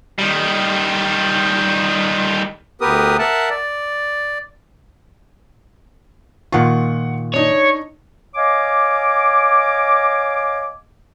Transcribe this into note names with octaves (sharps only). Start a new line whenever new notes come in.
D#3 G3
D2 B3 G4 A#4 B4 D#6
A#4 E5 F#5 A5
D5
A#2 D#3 F4 F#5 C#6
D4 D#4 C#5
C#5 D#5 F5 G#5 D6